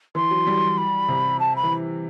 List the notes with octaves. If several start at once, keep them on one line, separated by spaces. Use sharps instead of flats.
E3 C6
F#3
G3
B5
C3
A5
B5
E3